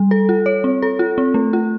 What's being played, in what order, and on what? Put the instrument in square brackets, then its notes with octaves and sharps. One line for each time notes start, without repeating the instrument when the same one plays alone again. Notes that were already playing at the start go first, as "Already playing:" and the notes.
Already playing: [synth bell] G3
A4
F4
C#5
C4
A4
F4
C4
A3
F4